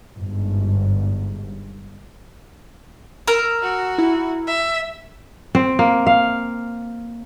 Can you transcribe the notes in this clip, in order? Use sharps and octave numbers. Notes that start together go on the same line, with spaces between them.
G1 G#2
A#4 E6
F#4
E4
E5
C4
A#3
F5